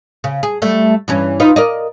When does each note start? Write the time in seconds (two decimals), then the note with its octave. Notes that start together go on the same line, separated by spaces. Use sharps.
0.24 C#3
0.43 G#4
0.62 G3 A3
1.08 G2 E3 C#4
1.40 D#4 F4 B4
1.56 A#4 D5 D#5